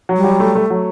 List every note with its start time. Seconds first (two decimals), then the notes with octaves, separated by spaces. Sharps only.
0.09 F#3
0.17 G3
0.24 F#3
0.40 A3
0.55 A3
0.70 F#3